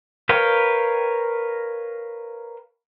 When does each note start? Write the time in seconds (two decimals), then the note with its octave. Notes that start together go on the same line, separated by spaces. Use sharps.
0.29 A#4 B4 C#5 F5 G5